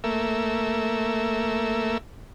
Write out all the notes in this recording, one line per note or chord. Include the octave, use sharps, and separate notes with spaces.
A3 A#3 E5